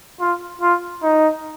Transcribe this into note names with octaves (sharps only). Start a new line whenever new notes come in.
F4
F4
D#4